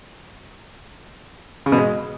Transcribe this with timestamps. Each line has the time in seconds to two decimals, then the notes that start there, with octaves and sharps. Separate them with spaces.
1.66 C#3
1.72 B2
1.78 G#3